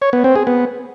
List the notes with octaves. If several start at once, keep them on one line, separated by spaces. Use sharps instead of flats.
C#5
B3
C4
G#4
B3